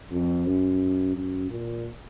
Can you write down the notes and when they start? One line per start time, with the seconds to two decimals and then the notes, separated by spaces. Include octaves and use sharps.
0.11 F2
0.46 F#2
1.15 F#2
1.50 A#2